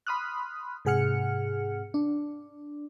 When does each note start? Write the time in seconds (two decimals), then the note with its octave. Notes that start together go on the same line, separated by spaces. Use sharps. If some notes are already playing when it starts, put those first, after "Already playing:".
0.07 B5 C6 D#6 F6 F#6
0.85 G#2 C3 G#4 F#5 F6 C#7
1.94 D4